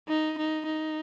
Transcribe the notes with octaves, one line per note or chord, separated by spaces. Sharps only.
D#4
D#4
D#4